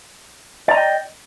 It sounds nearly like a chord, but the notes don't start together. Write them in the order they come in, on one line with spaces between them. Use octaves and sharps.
D5 A#5 D#5 G5